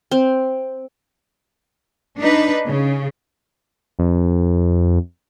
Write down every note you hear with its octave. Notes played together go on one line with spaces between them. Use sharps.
C4
D4 D#4 B4
C#3
F2